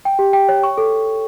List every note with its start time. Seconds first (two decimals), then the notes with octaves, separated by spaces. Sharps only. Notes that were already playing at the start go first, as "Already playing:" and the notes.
0.05 G5
0.19 G4
0.33 G5
0.49 C#5
0.63 C#6
0.78 A4